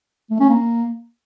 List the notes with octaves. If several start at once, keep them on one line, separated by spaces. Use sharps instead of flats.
A3
C#4
A#3